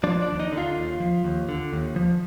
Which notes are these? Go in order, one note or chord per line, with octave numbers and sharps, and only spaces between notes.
F3 D4 D5
D4 D5
D#2
D#4 D#5
D3
F4 F5
D#2
F3
D#2
D3
D#2
F3